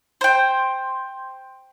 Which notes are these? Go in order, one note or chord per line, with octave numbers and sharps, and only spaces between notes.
C5 G5